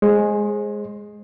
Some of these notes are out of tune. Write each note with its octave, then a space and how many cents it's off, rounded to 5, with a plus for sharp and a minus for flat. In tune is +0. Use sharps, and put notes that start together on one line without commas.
G#3 +0 C5 +35